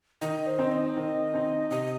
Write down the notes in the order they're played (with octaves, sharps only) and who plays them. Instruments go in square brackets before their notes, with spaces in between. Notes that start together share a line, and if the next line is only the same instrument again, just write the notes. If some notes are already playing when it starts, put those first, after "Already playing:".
[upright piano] D#3 [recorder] D#5
[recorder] C5
[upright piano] C4 D#4
[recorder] D#5
[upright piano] D#3
C4 D#4
[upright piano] C3 [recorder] D#5